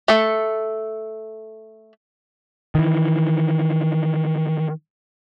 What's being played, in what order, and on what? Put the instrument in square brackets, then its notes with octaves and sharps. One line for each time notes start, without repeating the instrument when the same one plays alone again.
[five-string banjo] A3 A4
[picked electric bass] D#3 E3